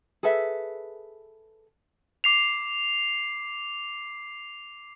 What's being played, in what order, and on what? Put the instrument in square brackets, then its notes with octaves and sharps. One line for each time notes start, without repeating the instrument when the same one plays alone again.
[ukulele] G#4 A4 B4 E5
[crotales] D6 C7 F7